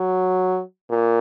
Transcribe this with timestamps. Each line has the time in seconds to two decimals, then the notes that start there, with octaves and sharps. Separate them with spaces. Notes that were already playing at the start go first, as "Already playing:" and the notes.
Already playing: F#3
0.90 A#2